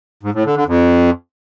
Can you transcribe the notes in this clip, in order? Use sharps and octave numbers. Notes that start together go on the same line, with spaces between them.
G#2
A2
D3
D3
F2